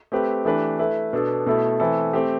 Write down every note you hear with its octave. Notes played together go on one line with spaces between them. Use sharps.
A3 C4 G4 B4
E3 A3 D4 G4 B4
A3 E4 B4
B2 B3 D4 A4
B2 A3 E4 A4
E3 A3 C4 E4 A4
A3 C4 G4